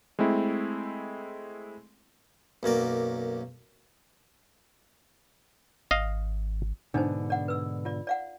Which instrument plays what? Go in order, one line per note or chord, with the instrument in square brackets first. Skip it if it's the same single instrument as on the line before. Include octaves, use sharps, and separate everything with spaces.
[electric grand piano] G#3 A3 C4 E4
[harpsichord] B1 F#2 A#3 D5
[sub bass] G#1 [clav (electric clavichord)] D#5 F5
[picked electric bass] G#2 B2 D3 [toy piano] D4 D#4 C5
[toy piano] D5 F#5
B4 E6
F4 D5
D5 F5 F#5